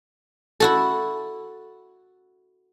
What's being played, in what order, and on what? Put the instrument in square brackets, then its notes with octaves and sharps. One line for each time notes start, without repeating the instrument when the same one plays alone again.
[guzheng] E4 F#4 A4